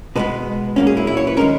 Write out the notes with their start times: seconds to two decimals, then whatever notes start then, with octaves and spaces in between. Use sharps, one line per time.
0.16 B2 G#3 B3 B4
0.76 A#2 F#3 A#3 C#4
0.87 G#4
0.97 E4
1.07 E4
1.17 C#5
1.27 B4
1.37 D#3 G#3 C#4 A#4